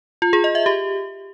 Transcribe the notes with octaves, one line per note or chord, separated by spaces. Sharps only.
F4
G#4
D#5
E5
G4